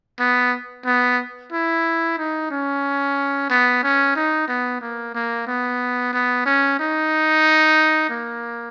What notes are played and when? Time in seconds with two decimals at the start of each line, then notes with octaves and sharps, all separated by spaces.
0.20 B3
0.86 B3
1.53 E4
2.18 D#4
2.51 C#4
3.50 B3
3.83 C#4
4.16 D#4
4.48 B3
4.81 A#3
5.15 A#3
5.47 B3
6.14 B3
6.46 C#4
6.79 D#4
8.10 A#3